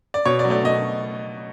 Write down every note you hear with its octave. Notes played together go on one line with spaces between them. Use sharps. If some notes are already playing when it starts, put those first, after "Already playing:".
D5
B2 C#5
D5
F#3
A3 D5
B2 D#5